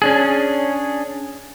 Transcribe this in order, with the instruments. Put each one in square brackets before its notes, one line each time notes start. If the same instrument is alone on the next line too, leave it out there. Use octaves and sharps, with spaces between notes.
[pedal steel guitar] C#4 D4 G#4